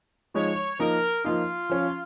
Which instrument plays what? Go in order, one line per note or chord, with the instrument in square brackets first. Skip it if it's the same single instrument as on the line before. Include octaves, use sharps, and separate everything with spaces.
[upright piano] F3 G#3 D#4 [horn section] C#5
[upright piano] F3 A#3 D#4 [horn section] A#4
[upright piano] F3 A#3 D#4 [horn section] F4
[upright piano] F3 C#4